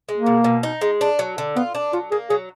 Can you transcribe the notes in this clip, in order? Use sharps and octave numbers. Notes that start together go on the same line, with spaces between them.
G#3
A#3
B2
B2
D#4
G#3
D4
F#3
D3
B3 F4
D4
F#3 F4
A#3 G#4
F#3 G#4